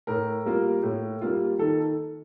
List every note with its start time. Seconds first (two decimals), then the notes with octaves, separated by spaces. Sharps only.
0.07 A2 A#4
0.45 G3 A#3 F4
0.83 A2
1.21 G3 A#3 F4
1.59 D#3 A4